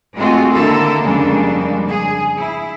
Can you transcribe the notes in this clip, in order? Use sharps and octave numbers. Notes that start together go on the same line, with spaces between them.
G#3 A3 C4 F4 F#4
D3 D#3 A#3 E4 A4
F2 C#3 G3 G#3 A#3 D4
G#4
E4